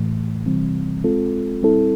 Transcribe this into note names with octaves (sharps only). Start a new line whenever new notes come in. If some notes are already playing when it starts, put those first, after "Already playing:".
Already playing: A2 E3 A3
C3 E3 G3 C4
G#3 C4 F4 A4
G3 C4 E4 A4